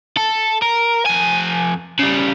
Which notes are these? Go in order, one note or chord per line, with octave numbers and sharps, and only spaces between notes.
A4
A#4
F2 G#5
C#3 G3